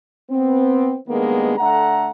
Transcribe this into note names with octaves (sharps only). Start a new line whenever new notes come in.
B3 C4
G2 D#3 G#3 A#3 B3
D3 A3 F#5 A#5